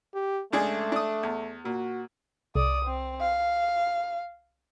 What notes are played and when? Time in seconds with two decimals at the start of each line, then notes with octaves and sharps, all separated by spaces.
0.14 G4
0.52 C#2 A3 D4 G#4
0.92 D4 D#6
1.23 E2
1.65 A#2 F#4
2.55 C2 D5 D#6
2.85 C4
3.21 F5